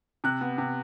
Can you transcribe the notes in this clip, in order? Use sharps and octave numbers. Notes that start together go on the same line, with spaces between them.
C3 F#6
B3
C3